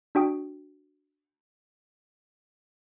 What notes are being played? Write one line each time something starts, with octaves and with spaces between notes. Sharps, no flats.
D4 F#4 G5 D#6